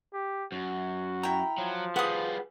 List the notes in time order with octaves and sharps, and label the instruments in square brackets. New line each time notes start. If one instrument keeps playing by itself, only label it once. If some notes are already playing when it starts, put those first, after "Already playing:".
[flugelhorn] G4
[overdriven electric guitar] F#2 [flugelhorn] F#4
[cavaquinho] E4 G5 [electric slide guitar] A#5
[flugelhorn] F3 [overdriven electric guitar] F#3
[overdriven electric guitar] G3 F4 [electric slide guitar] G#4 B4 [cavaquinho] F#5 D#6